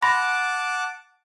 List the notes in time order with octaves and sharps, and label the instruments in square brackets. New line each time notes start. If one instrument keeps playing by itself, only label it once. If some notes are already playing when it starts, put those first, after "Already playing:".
[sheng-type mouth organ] F#5 A5 D6 [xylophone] B5 C6 A#6